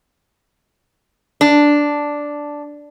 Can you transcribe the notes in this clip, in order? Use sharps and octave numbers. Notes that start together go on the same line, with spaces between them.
D4